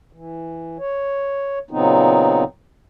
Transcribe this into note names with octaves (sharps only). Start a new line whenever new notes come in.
E3
C#5
A#2 C#3 F#3 B3 C4 D#4